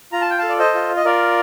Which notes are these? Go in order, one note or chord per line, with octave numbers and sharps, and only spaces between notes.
F4 A#5
A5
G5
A4 F5 A5
D5
C5 D#5
F4
D#5
F4 A#4 D5